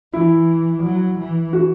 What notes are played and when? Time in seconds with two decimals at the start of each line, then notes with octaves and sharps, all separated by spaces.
0.13 E3 E4
0.83 F#3
1.19 E3
1.53 F#4